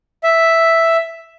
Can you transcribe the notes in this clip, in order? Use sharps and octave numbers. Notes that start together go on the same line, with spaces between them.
E5